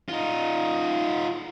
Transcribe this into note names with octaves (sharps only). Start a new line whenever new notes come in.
D#4 F4